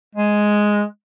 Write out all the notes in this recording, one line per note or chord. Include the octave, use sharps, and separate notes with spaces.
G#3